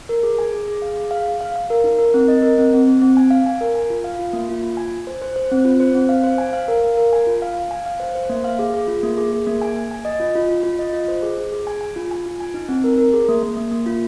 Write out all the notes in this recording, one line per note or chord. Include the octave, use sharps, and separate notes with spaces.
A#4
G#4
G#5
G#4
G#4
F5
G#4
F5
F5
F5
F5
A#4
D#4
A#4
C4
D#5
A#4
C4
C4
C4
C4
G#5
F5
G#5
A#4
G#5
F4
F5
F4
A#3
F4
F4
G#5
G#5
C5
C5
C5
C4
F4
C5
C4
F5
C5
G#5
F5
A#4
F5
A#4
G#5
F4
F5
F5
G#5
F5
C5
C5
A#3
F5
G#4
G#4
F4
A#3
G#4
G#4
A#3
G#5
G#5
G#5
D#5
F4
F4
F4
F4
D#5
F4
C5
G#4
G#4
G#4
G#5
G#5
F4
G#5
F4
G#5
D#4
C4
A#4
A#4
G#4
A#3
A#3
A#3
A#3
F4